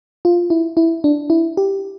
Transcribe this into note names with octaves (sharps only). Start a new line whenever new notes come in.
F4
E4
E4
D4
E4
G4